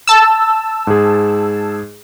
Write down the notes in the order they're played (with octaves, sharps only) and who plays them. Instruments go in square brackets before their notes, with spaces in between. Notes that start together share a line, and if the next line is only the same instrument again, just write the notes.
[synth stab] A5 E6
[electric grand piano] G#2 G#4